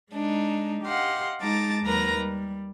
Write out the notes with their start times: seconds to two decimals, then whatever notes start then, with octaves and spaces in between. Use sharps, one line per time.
0.12 G#3 D4 D#4
0.84 G4 D#5 F5 F#5 C6
1.41 G#3 D#4 A5 A#5 D6 A6
1.85 D#2 F#3 A#4 B4 A#5 A#6
2.19 G3